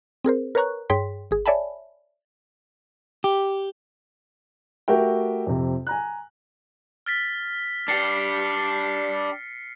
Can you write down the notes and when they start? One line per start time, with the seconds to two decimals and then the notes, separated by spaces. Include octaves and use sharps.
0.24 C4 G#4 A#4 C5
0.55 A#4 B4 C#5 A#5 C#6 F#6
0.90 G2 G#4 C#5 G5 C6 B6
1.31 G#1 G#4
1.46 C#5 D5 E5 G#5 A5 B5
3.24 G4
4.88 A3 F#4 G4 A#4 E5 G5
5.47 F2 C3
5.87 G#5 A#5 F#6
7.06 F6 A6 B6
7.88 D4 G4 A6 C7 C#7